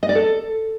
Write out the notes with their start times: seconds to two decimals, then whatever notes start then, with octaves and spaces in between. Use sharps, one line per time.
0.03 D#5
0.09 D5
0.15 A4